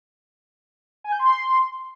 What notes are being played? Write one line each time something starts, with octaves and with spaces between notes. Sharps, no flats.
G#5
G6
C6